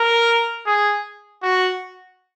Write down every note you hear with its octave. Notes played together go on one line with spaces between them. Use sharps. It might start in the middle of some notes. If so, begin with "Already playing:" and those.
Already playing: A#4
G#4
F#4